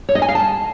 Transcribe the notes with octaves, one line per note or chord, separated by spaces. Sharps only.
C#5
D#5
G#5
F5
A5